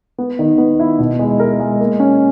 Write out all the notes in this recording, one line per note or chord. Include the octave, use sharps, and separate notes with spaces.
B3
D#3
B3
E4
B2
G#3
A#4
G#3
A#3
C#4